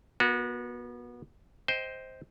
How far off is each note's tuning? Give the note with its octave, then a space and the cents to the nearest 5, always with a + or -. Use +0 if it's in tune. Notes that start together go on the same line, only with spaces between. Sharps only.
B3 -30 F#4 -25 A#4 +0
C5 +0 D#5 +20 G5 +0